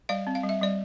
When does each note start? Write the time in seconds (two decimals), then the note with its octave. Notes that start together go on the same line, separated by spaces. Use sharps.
0.09 G3 D5 F5
0.27 C4
0.35 F5
0.43 G3
0.49 E5
0.61 G3 D5